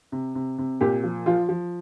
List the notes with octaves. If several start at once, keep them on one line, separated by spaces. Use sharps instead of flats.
C3
C3
C3
A#2 G4
F3
F3 F4
F3